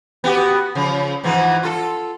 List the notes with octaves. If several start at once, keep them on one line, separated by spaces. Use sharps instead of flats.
B3 F#4 G4
C#3 F3
G#2 E3 F3
F4 A4